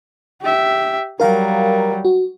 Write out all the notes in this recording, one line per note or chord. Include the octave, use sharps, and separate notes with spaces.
G4 E5
F#3 G3 A#4 F5 A#5
F#4